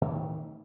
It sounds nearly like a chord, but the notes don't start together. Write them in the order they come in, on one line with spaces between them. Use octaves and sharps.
A2 E3 D#3 A3